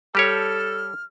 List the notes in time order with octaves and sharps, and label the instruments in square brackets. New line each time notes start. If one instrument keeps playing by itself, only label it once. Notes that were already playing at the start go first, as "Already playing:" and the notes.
[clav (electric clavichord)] G3 G4 C#5 [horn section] A4 [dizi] F6